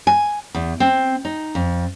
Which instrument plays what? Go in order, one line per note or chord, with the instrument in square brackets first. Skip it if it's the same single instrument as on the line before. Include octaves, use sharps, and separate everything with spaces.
[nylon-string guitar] G#5
E2
C4
D#4
F2